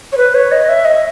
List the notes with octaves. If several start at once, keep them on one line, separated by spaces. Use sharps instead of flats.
C#5
B4
C#5
D#5
E5
D#5